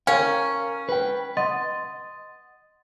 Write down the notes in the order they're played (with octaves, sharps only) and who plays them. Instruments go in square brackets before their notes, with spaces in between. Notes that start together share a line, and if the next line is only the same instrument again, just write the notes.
[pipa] C#4 [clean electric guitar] A#4 G5 [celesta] F5
[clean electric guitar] B4 G5
[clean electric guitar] D#5 [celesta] F#5 C6 A6